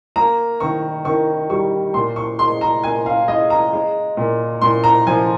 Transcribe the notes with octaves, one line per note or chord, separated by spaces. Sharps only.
A#3 A#5
D#3 C#6
D#3 C#6
G3 C#6
A#2 C6
C#6
G#3 C6
A#5
A#2 G#5
F5
G#3 D#5
A#5
G#3
A#2
A#2 C6
A#5
F3 G#5